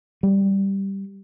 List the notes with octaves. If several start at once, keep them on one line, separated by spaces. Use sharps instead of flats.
G3